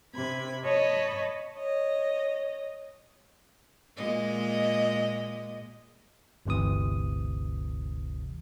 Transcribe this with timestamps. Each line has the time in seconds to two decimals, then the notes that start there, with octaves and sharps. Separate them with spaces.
0.14 C3 B5 G#6
0.63 C#5 D#5 A5 B5 C#6
1.55 C#5 D#5
3.97 A#2 G#3 D#5
6.45 G1 D2 C3 E3 D#6